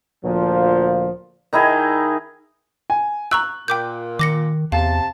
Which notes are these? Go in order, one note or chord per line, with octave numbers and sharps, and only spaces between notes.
D2 A#2 F3
D#3 D#4 E4 G#4
G#5
A#5 C#6 E6 F#6
A#2 G5 D6 G6
D#3 D6 A#6 C#7
E2 C3 F5 A5